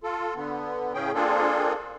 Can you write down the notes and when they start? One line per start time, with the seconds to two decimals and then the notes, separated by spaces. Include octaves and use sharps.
0.03 F4 A4
0.35 D3 B3
0.94 A2 C#3 C#4 G#4 G5
1.15 A#3 C4 D4 F4 G#4 A4